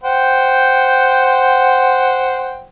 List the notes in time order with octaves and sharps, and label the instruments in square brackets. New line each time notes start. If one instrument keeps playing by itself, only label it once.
[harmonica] C5 F#5 G5